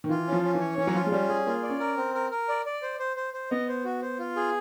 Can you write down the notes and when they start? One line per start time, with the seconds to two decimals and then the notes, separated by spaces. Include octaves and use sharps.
0.04 D#3
0.09 E3 F4
0.27 C#4
0.32 F3
0.43 C#4
0.55 E3
0.61 C#5
0.78 E3 C#4
0.87 F#3
0.94 F3 F4
1.06 G#3
1.12 G3 C#4
1.29 G3 G#4
1.46 A#3 F4
1.63 D5
1.69 C#4
1.80 A#4
1.97 C4
2.15 A#4
2.31 A#4
2.49 D5
2.66 D5
2.82 C5
2.99 C5
3.17 C5
3.33 C5
3.51 B3 D#5
3.68 C5
3.85 F#4
4.02 C5
4.19 F4
4.36 G#4